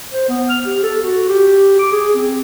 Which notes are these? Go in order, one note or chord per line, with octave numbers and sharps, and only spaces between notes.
C5
B3
F6
G4
A4
F#4
G4
D6
G#4
C4